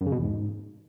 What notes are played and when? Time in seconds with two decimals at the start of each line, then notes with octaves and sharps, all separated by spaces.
0.01 F#2
0.06 C#3
0.12 B2
0.17 E2
0.23 G#2